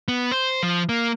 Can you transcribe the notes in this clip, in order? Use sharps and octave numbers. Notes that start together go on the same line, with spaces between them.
B3
C5
F3
A#3